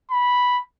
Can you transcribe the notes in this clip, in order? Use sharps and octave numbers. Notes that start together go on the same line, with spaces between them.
B5